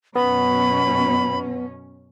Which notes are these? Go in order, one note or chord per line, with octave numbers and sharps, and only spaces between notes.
F#2 B2 B3 C#4 B5